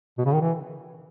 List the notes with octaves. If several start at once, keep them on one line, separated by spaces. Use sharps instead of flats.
B2
C#3
D#3
E3